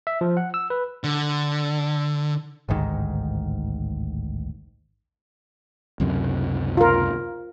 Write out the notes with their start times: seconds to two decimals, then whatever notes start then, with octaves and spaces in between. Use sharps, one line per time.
0.07 E5
0.21 F3
0.37 F#5
0.54 E6
0.70 B4
1.04 D3
2.69 A1 D2 G#2 D#3
6.00 C#2 F#2 C3
6.77 F4 A#4